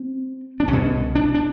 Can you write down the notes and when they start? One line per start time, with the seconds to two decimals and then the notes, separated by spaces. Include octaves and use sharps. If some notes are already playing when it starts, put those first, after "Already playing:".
Already playing: C4
0.60 D4
0.68 C2 C#4
0.73 B2
1.15 D4
1.34 D4